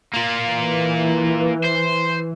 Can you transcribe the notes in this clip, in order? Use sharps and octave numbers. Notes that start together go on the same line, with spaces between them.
A#3 F4
E3
C5